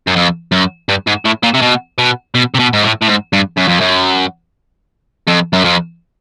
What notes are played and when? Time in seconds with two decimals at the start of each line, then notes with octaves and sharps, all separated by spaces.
0.07 F#2
0.16 F2
0.52 F#2
0.89 G2
1.07 G#2
1.25 A2
1.43 A#2
1.54 C3
1.62 B2
1.99 B2
2.35 B2
2.55 C3
2.59 B2
2.73 G#2
2.84 A2
3.02 A2
3.08 G#2
3.33 G2
3.57 F#2
3.67 F2
3.80 F#2
5.28 F2
5.53 F#2
5.64 F2